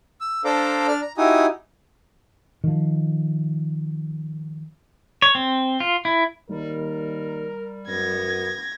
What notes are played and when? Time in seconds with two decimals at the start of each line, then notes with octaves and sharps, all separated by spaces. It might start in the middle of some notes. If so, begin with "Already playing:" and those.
0.21 E6
0.45 D4 A4 C5 F5 A#5 D6
0.88 D4 D5 F6
1.02 A#5
1.18 D#4 E4 F#4 G4 G#5 D#6
2.64 D#3 F3
5.22 C#5
5.35 C4
5.80 F4
6.05 E4
6.49 D#2 G3 A#4
7.88 F#2 B3 G#6 A#6